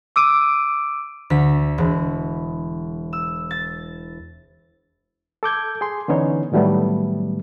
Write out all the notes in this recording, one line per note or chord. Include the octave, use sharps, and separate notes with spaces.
D6 E6 D7 D#7
D2 B6
E1
E6
A6
A4 D6 G6 G#6
G#4 C6
D3 E3 B3 C#4 D#4 C#5
A2 D#3 F#3 G3 A3 B3